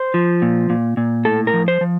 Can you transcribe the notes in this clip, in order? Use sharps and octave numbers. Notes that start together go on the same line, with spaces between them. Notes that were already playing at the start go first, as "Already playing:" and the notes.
Already playing: C5
F3
A#2
A#2
A#2
A2 A4
A#4
F3
C5
F3